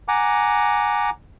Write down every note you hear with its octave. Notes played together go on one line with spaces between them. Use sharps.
F#5 G#5 A#5 D6